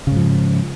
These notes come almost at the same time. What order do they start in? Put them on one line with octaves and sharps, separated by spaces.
C#3 G#2 F3